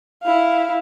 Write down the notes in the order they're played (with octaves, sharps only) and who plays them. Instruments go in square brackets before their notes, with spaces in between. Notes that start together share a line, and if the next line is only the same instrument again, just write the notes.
[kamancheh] E4 F5